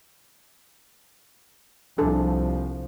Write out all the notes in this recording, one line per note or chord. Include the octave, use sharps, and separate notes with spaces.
C2 F3 D4 G#4 A4